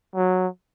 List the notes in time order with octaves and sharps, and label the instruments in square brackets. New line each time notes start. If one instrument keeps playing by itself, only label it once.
[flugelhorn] F#3